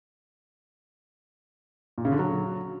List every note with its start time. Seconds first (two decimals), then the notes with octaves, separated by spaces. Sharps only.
1.98 A#2
2.05 C#3
2.12 D3
2.19 F#3